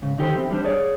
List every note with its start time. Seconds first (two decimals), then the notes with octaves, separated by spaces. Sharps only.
0.02 G#2 C#3
0.18 D#3 D#4 G4 A4 A#4 C5
0.35 E3 C4
0.51 G3 D4 C5
0.64 G#4 C#5 D5